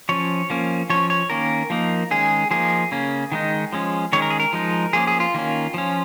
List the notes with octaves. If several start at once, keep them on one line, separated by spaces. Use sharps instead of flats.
F3 C#4 C#5
F3 A#3 C#4
F3 C#4 C#5
C#5
D#3 A#3 C#4 A#4
F3 A#3 D#4
D#3 G#3 C#4 G#4
F3 A#3 D#4 G#4
C#3 A#3 C#4
D#3 G#3 D#4
F3 G#3 C#4
D#3 G#3 C#4 C#5
A#4
G#4
A#4
F3 G#3 D#4
F3 A#3 C#4 G#4
G#4
F4
D#3 A#3 C#4
F3 C#4